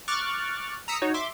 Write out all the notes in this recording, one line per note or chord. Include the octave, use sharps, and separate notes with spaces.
C#6 D6 F6 F#6 A6
A#5 D#6 E6 B6 C#7
D#4 F#4 C#5
E5 C6 D6